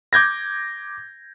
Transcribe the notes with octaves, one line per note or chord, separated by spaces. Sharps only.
D6 G6 G#6 A#6